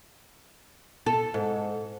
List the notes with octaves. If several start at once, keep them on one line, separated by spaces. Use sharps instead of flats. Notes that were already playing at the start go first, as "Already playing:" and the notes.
A4
G#2